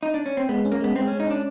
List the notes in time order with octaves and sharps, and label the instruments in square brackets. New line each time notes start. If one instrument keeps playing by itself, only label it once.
[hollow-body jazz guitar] D#4
D4
C#4
C4
[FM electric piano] G#3 [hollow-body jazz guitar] B3
[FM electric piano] C#4
[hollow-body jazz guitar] A#3
[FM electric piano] G#3 [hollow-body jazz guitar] B3
[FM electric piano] G#3 [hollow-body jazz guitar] C4
[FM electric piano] G#3 [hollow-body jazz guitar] C#4
[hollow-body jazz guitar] D#4
[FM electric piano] C#4 [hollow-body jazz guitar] D4